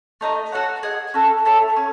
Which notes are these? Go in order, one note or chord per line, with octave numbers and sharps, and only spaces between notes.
A3 D#4 A4 D#5
F#4 A4 C#5 F#5
G#4 D#5 F#5
C#4 F#4 A4
E4 A4 C#5
C#4